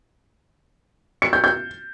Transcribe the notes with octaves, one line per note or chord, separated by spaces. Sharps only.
C#7
G6
G6